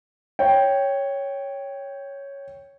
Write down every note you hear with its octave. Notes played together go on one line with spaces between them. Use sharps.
C#5 G5